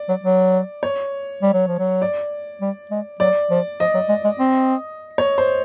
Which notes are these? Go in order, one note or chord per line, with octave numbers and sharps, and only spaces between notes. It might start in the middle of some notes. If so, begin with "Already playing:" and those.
Already playing: D5
F#3
F#3
C#5
G3
F#3
F3
F#3
D5
G3
G#3
F#3 D5
F3
F3 D#5
F#3
G#3
G#3
C4
C#5
C5